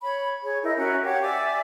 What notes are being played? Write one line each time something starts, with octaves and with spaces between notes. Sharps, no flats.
C#5 B5
G#4 C#5
E4 A#4 D#5 G6
C#4 F#4 A#4 E5
G4 C#5 F5 F#5
D5 E5 G#5 D6